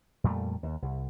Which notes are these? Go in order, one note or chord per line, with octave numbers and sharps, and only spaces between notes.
F2 A#2 G3 A3
D#2
C2